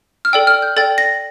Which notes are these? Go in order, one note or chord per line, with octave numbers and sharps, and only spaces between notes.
F6
A4 D5 G5 E6
F6
G6
A4 D5 G5 A6
A#6